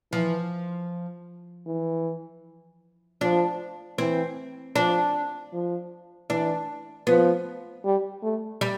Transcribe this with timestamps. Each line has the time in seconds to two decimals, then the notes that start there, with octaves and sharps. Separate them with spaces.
0.12 E3 F3
1.67 E3
3.21 F3 D4
3.98 E3 C4
4.76 F3 D4
5.53 F3
6.30 E3 D4
7.07 F3 B3
7.84 G3
8.23 A3
8.61 G3